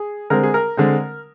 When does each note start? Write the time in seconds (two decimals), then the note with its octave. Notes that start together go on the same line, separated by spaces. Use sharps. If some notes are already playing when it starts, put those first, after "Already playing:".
Already playing: G#4
0.30 D3 G#3 C4 A#4
0.43 G#4
0.54 A#4
0.77 D3 G#3 C4